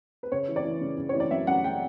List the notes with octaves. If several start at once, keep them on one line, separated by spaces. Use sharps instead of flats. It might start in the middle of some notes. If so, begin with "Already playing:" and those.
B4
C#3 C#5
E3
D5
E3
C#3
C#3
C#5
E3
D5
F#2 E5
F#2 F#5
G5